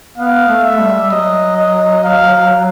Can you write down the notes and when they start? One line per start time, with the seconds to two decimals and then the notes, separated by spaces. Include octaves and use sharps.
0.17 B3 F5
0.49 A3
0.64 E5
0.80 G3
1.00 G3
1.11 F#3 D#5
1.57 D#5
2.04 F5